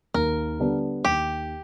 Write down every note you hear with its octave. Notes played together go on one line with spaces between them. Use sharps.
D#2 A#4
D3 G3 B3 D4
D#2 G4